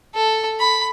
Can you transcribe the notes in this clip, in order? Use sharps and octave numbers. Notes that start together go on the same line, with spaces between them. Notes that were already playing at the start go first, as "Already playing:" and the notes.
A4
B5